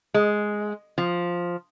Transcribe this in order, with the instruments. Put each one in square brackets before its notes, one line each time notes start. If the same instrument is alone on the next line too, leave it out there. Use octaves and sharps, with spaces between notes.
[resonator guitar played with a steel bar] G#3
F3